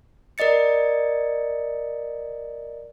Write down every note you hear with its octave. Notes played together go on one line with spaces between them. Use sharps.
A#4 D5 D#5 A6 C#7